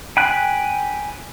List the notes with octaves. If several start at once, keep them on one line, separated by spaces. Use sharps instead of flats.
G5 G#5 B5 F#6